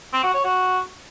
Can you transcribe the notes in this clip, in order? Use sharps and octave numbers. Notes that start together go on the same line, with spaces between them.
C4
F#4
C#5
F#4